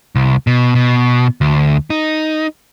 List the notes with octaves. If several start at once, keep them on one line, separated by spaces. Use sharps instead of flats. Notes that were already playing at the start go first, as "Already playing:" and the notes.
C2
B2
B2
D2
D#4